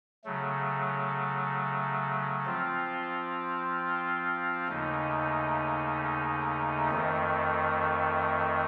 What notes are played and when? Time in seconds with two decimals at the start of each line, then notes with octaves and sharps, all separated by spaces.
0.24 C#3 F#3 A3
2.46 F3 C4 F4
4.68 D#2 C#3 A3 D#4
6.90 F2 D#3 A3